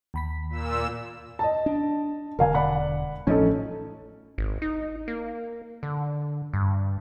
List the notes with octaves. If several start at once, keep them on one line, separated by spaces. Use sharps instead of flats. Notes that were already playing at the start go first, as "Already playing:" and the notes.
D#2 B5 B6
A#2 E6
D#5 A5
D4
E1 D3 A#4 F5 G#5
D5 F#5 B5
A1 F3 A3 C#4 D#4 A4
G#1
D#4
A#3
D3
G2